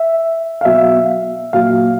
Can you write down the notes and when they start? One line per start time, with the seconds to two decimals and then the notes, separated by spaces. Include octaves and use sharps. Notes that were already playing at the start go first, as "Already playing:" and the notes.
Already playing: E5
0.61 F5
0.65 B2 F#3 E5
1.53 A#2 F#3 F5